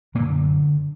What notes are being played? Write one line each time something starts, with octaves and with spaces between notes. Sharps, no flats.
F#2 A#2 D3 A#3